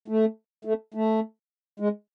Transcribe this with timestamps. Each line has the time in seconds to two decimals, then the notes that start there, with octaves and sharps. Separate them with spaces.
0.08 A3
0.65 A3
0.94 A3
1.80 G#3